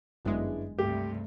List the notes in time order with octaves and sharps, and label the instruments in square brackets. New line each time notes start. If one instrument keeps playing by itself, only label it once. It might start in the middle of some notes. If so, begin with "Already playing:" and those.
[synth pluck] G1 F#2 G#3 [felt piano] B3 D4 E4
[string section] C#2 G2 C3 [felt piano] A3 [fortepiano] G4